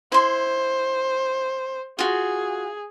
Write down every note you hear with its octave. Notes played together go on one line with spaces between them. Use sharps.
E4 C5 C6
F4 F#4 G#4